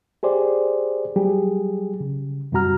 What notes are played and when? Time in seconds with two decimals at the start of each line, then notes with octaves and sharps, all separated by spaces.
0.23 G4 G#4 C5 D5
1.16 F#3 G3 G4 G#4
2.00 C#3
2.52 F#2 C3 G3 F#4 A#5 F6